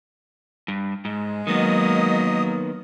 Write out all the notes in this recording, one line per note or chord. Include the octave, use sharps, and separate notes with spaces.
G2
G#2 G#3
D#3 F#3 A#3 B3 D#5 D#6